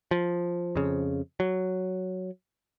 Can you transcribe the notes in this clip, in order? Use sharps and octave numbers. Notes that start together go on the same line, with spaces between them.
F3
F2 C#3
F#3